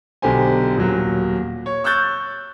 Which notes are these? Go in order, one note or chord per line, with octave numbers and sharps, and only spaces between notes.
B1 D3 G4 C5 G#5
D#1 F#3
C#5
C#6 E6 F#6 G6 A6